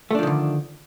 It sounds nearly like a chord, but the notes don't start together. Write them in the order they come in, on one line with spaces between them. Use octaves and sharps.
A3 D4 F3 D#3 D3